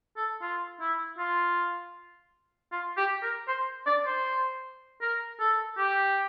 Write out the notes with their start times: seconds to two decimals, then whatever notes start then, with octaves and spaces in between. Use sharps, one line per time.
0.17 A4
0.42 F4
0.81 E4
1.19 F4
2.72 F4
2.97 G4
3.23 A#4
3.48 C5
3.86 D5
4.06 C5
5.02 A#4
5.40 A4
5.78 G4